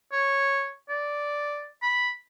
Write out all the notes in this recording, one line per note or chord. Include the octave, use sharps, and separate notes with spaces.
C#5
D5
B5